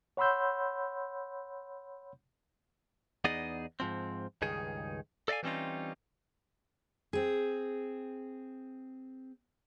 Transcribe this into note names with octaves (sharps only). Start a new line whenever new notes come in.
C#5 F#5 B5 C6 E6 G6
E2 B3 D#4 G#4 D5 D#5
G#2 F3 C4
C#2 G2 D#3 D#4 G#4
A4 D5 D#5 F5 G#5
E3 G3 C4 C#4 D#4 F4
C4 G#4